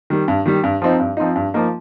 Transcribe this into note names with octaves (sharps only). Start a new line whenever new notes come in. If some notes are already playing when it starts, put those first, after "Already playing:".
D#3 G3
G2
D#3 G3
G2
F3 C4 D#4
G2
F3 C4 D#4
G2
F3 A#3 D#4